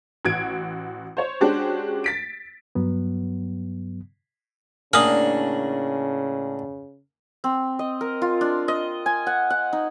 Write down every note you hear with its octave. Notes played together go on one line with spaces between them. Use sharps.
A1 F#4 G#6 D7
C5 C#5
G#3 C#4 D4 F#4 G4 C5
A6 B6 D7
G2 F#3 B3
A2 C#3 A#3 D4 F#5 G#5 D#6 F6
C4
D#5
A#4
F4
D4
D#5
G#5
F#5
F#5
D#4